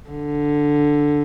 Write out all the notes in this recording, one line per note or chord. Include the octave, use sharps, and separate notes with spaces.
D3